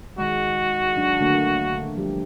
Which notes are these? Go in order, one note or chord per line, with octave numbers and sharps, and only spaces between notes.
D#3 G#3 F#4
F#3 D4
D3 A3 A#3
F3 G3 G4